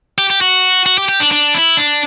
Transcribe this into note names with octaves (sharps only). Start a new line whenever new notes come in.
G4
G4
F#4
F#4
G4
G4
D4
D4
E4
D4